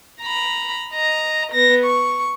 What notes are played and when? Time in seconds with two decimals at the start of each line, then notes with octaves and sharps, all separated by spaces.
0.21 A#5 B5
0.94 D#5 A#5
1.53 B3 A#6
1.84 C#6